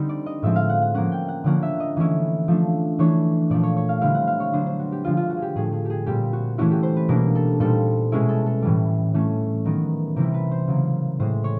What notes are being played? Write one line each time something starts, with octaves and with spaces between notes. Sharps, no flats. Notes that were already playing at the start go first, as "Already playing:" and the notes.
Already playing: D3 G3 C4 D#4
D5
D#5
A2 F3 G#3 C4 E5
F5
F#5
F#5
F3 A#3 C#4 F#5
G5
F#5
D3 F3 A#3 C#4 F#5
E5
D#5
E3 A3 C#4 E4
F3 A3 D4
E3 A3 D4 C#5
A#2 F3 A3 D5
C#5
C#5
F5
D3 G3 C4 E4 F5
F#5
F5
C#5
F#3 B3 D4 C5
C5
F#4
G4
D3 F3 G#3 F4
F4
F#4
G#4
G4
A2 F3 A3 G#4
G#4
G4 G#4
A#2 G3 C4 G4
F#4
E3 A3 C#4 E4 F#4
G4
C5
B4
B2 G3 A#3 D4 A#4
A4
A#2 G3 C4 D#4 A4
B2 G#3 C#4 E4 G#4
A4
A4
A2 E3 G3
E3 A3 C#4
D#3 F#3 B3 A#4
C3 E3 G3 C4 E4 A#4
B4
C5
C#3 F#3 A#3
A2 E3 G#3 C5
C#5